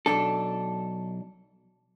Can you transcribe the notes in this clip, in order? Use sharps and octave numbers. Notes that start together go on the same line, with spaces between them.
B1 E2 D4 A4